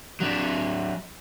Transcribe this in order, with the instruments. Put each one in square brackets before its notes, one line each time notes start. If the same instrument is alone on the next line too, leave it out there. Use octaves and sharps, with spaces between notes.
[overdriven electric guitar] F#3 D4